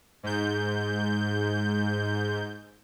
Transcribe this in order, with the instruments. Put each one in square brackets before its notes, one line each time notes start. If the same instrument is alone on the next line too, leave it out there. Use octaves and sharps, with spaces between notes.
[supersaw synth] G#2 G6